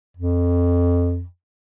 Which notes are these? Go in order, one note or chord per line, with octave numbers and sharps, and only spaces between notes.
F2